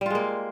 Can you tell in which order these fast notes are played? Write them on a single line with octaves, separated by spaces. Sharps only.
G3 F4 G#3 A#3